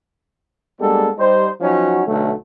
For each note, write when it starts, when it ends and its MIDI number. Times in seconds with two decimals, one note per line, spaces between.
0.80 1.08 55
0.80 1.08 56
0.80 1.08 58
0.80 1.08 59
0.80 1.08 62
0.80 1.08 69
1.18 1.48 55
1.18 1.48 63
1.18 1.48 72
1.61 2.04 53
1.61 2.04 54
1.61 2.04 61
1.61 2.04 63
1.61 2.04 66
2.06 2.32 35
2.06 2.32 50
2.06 2.32 54
2.06 2.32 57